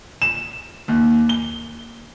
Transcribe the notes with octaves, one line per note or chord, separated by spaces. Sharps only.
E7
D#2
G7